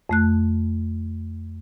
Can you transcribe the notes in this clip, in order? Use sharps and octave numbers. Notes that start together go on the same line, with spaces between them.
F2 A3 F#6